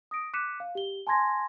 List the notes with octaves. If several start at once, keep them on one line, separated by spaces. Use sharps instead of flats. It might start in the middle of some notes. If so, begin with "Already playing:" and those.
D#6 A#6 D7
D6 F#6 B6 C#7 D#7 E7
F5
G4 G7
G#5 A5 C6 G#6 A#6